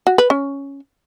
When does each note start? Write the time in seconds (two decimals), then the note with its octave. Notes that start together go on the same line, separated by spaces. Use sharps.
0.07 F#4
0.18 B4
0.30 C#4